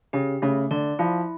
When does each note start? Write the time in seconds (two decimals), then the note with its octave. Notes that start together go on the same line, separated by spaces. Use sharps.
0.13 C#3 G4
0.42 C#3 A3
0.71 D3 D5
0.99 F3 E4